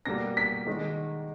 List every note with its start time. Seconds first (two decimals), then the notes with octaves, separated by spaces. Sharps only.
0.05 B2 G3 A#3 A#6
0.37 B6
0.67 D#3 G#3